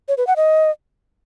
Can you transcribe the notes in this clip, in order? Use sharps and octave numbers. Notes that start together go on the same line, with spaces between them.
C#5
B4
F#5
D#5